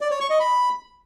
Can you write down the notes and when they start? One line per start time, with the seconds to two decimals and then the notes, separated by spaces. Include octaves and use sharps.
0.01 D5
0.11 C#5
0.20 C#6
0.30 D#5
0.40 B5